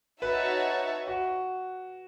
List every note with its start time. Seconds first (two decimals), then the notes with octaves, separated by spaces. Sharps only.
0.22 D#4 F#4 B4 C#5 E5 A5
1.07 F#4